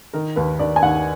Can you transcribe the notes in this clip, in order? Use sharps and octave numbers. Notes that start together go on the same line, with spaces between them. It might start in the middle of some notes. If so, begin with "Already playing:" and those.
D#3 A#4
D#2 B4
D#2 D5
G#5
D#2 F#5